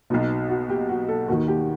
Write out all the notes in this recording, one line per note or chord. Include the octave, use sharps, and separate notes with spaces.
B1 B2 D#4
F#4
G4
F#4
A4
D#2 D#3 F#4
G4